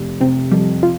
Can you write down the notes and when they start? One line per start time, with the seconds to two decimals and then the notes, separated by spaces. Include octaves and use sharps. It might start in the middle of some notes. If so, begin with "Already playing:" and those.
Already playing: F1
0.20 C3 C4
0.51 F2 G3
0.83 F4